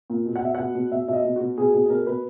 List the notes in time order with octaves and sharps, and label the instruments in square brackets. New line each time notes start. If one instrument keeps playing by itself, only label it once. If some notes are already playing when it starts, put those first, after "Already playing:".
[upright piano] A#2
B2
F#5
B2 E5
B2 F#5
B2
B2 E5
B2 D#5 E5
B2
B2 F#4
B2 G#4
B2 G#4
G#4
B2 A#4
B2 B4